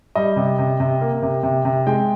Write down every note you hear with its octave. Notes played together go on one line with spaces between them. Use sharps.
G3 D#5
C3
C3
C3
A#3
C3
C3
C3
G#3 G5